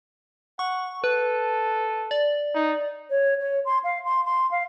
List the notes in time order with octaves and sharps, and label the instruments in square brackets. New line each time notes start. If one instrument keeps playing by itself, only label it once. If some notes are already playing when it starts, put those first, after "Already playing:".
[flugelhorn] F#5 [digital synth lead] C#6
[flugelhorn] A4 [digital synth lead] B4
[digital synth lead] D5
[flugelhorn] D#4
[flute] C#5
C#5
C6
F5
C6
C6
F5